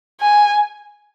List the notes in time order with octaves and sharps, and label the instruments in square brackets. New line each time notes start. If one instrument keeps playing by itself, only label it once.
[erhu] G#5